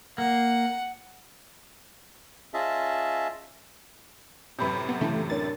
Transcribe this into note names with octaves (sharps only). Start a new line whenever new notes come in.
A#3 F#5
C#4 F4 G#4 D#5 E5 A5
F#2 A2 C3 B4 B5 G6
B3
C#3 E3 A3
D4 A#4 C#5 A6